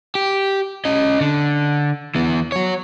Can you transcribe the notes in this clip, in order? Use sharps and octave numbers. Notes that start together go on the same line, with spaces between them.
G4
C#4 D#5
D3
E3 B3
F#3 C#5